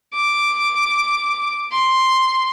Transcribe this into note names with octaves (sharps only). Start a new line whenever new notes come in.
D6
C6